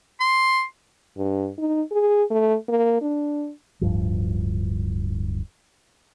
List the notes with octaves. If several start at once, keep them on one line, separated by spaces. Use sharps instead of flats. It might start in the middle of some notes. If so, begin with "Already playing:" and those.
C6
G2
D#4
G#4
A3
A#3
D4
D1 G2 F3